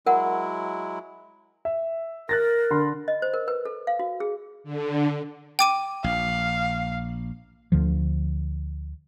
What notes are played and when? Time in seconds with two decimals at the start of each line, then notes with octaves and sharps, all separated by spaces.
0.06 F#3 G#3 E4 A#4 F#5
1.65 E5
2.29 A#4 F#6 A6 A#6
2.71 D3 B5 C6
3.08 D#5
3.22 C5
3.34 A#4
3.48 B4
3.65 A4
3.87 F5
3.99 F#4
4.20 G#4
4.64 D3
5.59 G5 D6 D#7
6.04 A#1 F5
7.72 D2 D3 F3